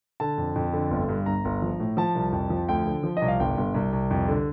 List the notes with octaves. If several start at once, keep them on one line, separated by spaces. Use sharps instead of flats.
D3 A5
F2
F2
D3
G1
G2
G1 A#5
G1
F3
A2
F3 A5
C2
F2
F3
D2 G5
D3
F3
D#5
C2
F5
G1 G5
G1
C2
C2
F2
D3